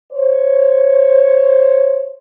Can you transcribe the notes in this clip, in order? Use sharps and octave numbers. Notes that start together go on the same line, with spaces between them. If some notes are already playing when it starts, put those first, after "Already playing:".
C5 C#5